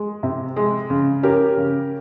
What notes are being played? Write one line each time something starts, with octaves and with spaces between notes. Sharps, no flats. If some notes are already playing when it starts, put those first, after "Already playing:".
Already playing: G#3
C3
G#3
C#3
C#4 G4 A#4
C#3